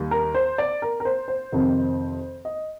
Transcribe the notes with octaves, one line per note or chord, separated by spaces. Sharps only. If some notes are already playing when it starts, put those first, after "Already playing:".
Already playing: D#2 D#3 G3
A#4
C5
D5
A#4
A#4
C5
C5
F2 C3 D#3
D#5